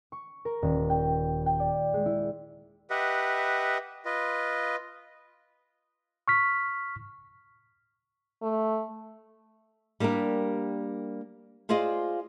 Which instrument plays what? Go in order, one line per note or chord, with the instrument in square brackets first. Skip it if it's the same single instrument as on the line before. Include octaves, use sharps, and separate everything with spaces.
[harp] C#6
A#4
D#1
G5
G5
D5
G#3
E4
[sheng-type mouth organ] G4 B4 D#5 E5 F#5
F4 B4 D#5
[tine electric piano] C#6 F6 B6
[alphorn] A3
[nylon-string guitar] G3 A#3 D4 G4 A#4
F4 G#4 C5 D5 D#5 F5